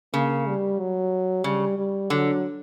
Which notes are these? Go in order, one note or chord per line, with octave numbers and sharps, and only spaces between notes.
C#3 A#3
G3
F#3
C#3 G3
G3
D3 F#3